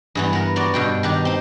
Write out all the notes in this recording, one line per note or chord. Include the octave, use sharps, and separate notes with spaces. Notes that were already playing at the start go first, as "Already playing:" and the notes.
G2 E3 B3
B3 A#4
B3 F#4 D5
G2 B2 G5
D#3 D4 G4
C4 D#4